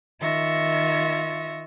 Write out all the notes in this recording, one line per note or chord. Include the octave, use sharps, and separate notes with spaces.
D#3 F4 E5 C#6 A#6